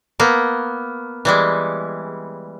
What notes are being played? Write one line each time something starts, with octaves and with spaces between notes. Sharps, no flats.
A#3 B3
E3 G3 G#3